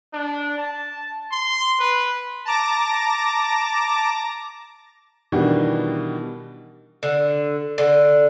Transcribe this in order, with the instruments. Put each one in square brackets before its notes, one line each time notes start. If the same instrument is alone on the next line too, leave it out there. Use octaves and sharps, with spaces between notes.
[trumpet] D4
A5
C6
B4
[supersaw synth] A5 A#5 D6 A#6
[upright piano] B2 D#3 E3 G3 D4 F#4
[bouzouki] D3
D3